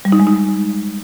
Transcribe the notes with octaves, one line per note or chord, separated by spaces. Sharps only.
G3
D#4
G#3
D#4